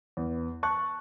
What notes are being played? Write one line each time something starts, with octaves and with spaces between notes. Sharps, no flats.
E2
A5 C#6 F#6